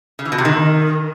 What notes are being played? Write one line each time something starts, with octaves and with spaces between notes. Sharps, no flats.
C#3
E3
B2
C3
D#3